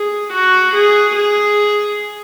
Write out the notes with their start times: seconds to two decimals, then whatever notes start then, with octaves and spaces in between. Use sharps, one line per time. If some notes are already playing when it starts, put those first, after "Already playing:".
Already playing: G#4
0.33 F#4
0.74 G#4
1.16 G#4